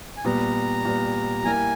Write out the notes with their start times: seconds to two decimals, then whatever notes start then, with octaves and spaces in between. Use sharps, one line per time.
0.17 G#5
0.25 A#2 G3 B3 A#5
0.85 A#2 G3 B3
1.44 G3 A#3 E4 A#4 G#5